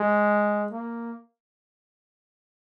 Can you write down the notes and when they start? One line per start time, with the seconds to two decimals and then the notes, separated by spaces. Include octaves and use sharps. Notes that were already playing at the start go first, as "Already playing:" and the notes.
Already playing: G#3
0.72 A#3